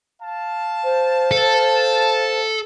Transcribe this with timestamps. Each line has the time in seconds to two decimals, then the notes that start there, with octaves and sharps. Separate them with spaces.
0.22 F5 A5
0.84 C5
1.31 A4